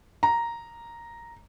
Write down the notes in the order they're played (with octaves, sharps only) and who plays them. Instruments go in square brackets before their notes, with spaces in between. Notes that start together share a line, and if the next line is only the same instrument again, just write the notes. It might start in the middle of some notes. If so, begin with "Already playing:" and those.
[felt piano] A#5